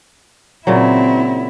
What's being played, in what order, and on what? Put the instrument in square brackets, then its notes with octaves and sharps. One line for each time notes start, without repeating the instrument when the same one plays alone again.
[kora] A#2 C#3 F#3 [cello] C4 E4